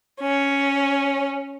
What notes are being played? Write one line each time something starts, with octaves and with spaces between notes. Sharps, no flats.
C#4